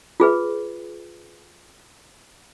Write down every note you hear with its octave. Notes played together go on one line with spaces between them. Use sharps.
F4 G#4 B4